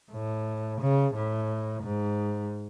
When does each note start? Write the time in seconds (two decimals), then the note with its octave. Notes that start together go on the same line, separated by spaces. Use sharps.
0.12 A2
0.81 C#3
1.15 A2
1.83 G#2